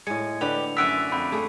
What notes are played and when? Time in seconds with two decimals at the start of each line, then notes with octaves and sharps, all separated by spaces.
0.07 A2 G#3 G#5 C#7
0.41 D3 G4 B4 F7
0.77 F#2 D5 E5 F#5 E6 B6 D7 D#7
1.12 F2 B5
1.32 A3 G#4